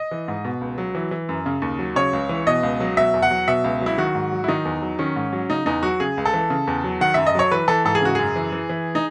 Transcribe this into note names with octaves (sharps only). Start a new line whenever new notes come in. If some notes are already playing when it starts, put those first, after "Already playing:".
Already playing: D#5
E3
G#2
B2
C#2
F#3
E3
E3
F#2
C#3
D#2
F#3
C#3 C#5
C#2
E3
B2 D#5
C#2
F#3
B2 E5
E2
F#5
F#3
B2 E5
C#2
F#3
E4
D#3 F#4
G#2
F#3
E4
D#3 D#4
E2
F#3
D#3 C#4
G#2
F#3
C#3 D#4
E2 D#4
F#3 F#4
C#3 G#4
C#2
A4
E3
C#3
E2
F#3
D#3 F#5
F#2 E5
D#5
F#3 C#5
E3 B4
E3 A4
G#2 A4
G#4
C#3 F#4
F#2 G#4
E3
E3
E3
D#4